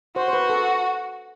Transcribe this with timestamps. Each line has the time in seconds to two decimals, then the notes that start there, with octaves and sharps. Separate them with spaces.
0.16 F#4 C5
0.28 C5
0.33 B4
0.50 A4